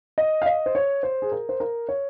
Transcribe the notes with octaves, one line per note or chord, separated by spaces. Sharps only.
D#5
F5
D#5
C5
C#5
C5
G#4
A#4
C5
A#4
C#5